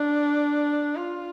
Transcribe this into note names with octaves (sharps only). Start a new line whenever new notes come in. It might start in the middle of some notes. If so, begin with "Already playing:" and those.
Already playing: D4
F4